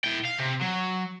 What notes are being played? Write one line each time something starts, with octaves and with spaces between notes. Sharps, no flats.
E4 G5
F5
C3
F#3